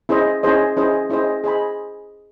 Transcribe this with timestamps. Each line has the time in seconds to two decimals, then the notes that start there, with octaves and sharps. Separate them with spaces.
0.09 C#4 E4 G#4 C5 D#5
0.43 C#4 E4 G#4 C5 D#5
0.77 C#4 E4 G#4 C5 D#5
1.10 C#4 E4 G#4 C5 D#5
1.44 G#4 C5 D#5 G#5 B5